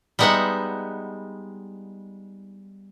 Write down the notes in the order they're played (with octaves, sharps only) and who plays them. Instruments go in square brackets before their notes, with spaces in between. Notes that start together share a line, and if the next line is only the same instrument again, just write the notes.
[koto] G3 G#3 B3 D#4 E5 F#5